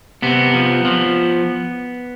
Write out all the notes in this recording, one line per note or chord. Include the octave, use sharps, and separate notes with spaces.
C3 B3
F3
F3